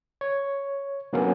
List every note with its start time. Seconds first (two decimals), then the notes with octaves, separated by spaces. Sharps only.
0.21 C#5
1.13 D3 F#3 A#3 B3 C#4